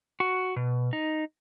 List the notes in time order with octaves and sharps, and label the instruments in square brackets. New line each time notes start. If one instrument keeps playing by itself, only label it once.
[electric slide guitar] F#4
B2
D#4